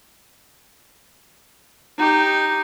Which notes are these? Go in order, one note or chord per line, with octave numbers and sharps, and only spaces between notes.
D#4 G4